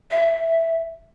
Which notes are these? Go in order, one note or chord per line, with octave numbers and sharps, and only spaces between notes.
E5